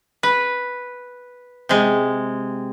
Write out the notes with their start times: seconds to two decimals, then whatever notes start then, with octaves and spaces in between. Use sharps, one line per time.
0.23 B4
1.69 C3 G#3